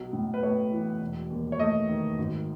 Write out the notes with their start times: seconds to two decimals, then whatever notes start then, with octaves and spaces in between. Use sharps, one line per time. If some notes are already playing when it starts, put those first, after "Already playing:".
Already playing: B1 F#3
0.13 A2
0.34 B4
0.43 A3 C#5
0.72 E3
1.01 E1
1.30 D#2
1.52 C#5
1.59 A3 D#5
1.89 D#3
2.18 G#1